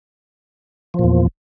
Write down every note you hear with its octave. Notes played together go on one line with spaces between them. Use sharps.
E2 A#2 F3